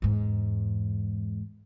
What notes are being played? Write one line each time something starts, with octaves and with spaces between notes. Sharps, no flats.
E2 G#2